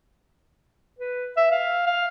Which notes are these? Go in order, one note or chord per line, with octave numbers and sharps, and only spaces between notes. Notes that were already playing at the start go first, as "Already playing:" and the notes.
B4
E5
F5
F5